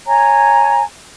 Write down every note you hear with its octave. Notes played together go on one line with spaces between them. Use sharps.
C#5 G#5 A#5